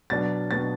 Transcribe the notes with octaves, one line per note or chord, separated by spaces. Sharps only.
B2 F#3 B3 D4 A6
B2 F#3 B3 D4 A6